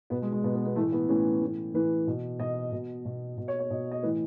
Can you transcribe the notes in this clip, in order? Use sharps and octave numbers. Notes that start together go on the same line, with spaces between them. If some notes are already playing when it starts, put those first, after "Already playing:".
B2 B3
G#3
G#3
B2 B3
B3
B3
A2 E3 A3
B3
A2 E3 C#4
A2 E3
A2 E3 B4
B2
B2 D#5
B2
B2
B2
C#5
C#5
B2 D#5
D#5
A2 E3 B4